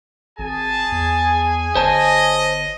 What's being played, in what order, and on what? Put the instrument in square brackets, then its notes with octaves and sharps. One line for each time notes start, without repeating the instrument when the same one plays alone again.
[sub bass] G#1 [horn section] G#4 G#5 [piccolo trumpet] A5
[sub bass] E2
[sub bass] G1 [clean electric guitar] C5 C#5 A5 [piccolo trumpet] D#5